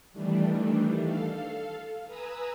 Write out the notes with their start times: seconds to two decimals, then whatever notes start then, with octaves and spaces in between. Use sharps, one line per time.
0.13 D#3 E3 G3 A3 D4
0.99 A4 F5
2.07 B4 G#5 A#5 D#6 E6